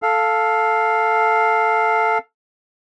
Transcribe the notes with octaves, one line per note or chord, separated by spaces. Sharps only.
A4 F5